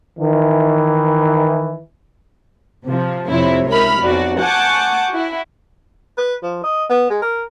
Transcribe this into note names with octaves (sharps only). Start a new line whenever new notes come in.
D#3 E3
C3 F3
F2 C3 C4 E4 C#5
C#2 D#4 A#4 E5 B5 F6
B1 F2 F#4 D5
F#5 G#5 A5 C#6 D6 G6
E4 F#4
B4
F3
D#5
B3
G#3
A#4